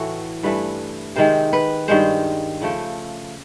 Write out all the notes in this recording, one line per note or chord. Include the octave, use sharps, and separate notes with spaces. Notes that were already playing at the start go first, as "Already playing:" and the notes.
Already playing: A2 E3 A3 F#4
G2 E3 A3 B4
C3 D#3 G#3 C5
B4
G2 D#3 G#3 C5
C#3 F3 A3